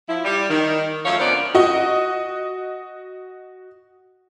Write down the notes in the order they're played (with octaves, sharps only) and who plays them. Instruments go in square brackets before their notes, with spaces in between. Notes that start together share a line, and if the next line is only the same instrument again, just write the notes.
[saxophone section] F3 E4
G3
D#3
F#2 F3 A3 C#5 F5
A#2 B3 D4 A#4 C5 D5
[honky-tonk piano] F#4 D#5